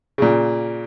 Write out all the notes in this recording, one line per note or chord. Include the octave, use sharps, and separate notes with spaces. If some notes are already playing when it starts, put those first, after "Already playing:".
A#2 C#3